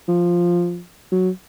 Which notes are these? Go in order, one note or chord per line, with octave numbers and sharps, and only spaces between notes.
F3
F#3